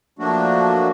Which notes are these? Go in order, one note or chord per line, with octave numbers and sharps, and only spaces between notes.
F3 F#3 A3 A#3 D4 F#4